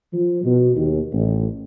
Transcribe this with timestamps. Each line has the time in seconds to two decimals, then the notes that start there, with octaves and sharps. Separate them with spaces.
0.13 F3
0.44 B2
0.76 D#2
1.13 A1